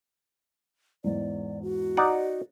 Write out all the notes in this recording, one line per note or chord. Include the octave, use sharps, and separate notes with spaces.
E2 G#2 D5
F#4
D#4 D5 F#5